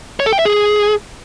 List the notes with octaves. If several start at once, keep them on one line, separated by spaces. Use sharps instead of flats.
C#5
A4
G5
E5
G#4